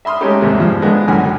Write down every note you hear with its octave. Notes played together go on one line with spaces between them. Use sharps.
E5 B5 C6 D#6 F6
G#3 A3 C#4 D#4 G4
E2 G#2 C3 G#3
G2 F3
F3 G#3 B3 D4
C#2 F#2 D3 F#4 G#5